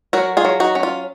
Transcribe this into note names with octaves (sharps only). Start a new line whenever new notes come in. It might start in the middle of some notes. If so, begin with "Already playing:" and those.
F#3 F#4 A#4
F4 G#4
F#3
D#4 F#4
C#4
F4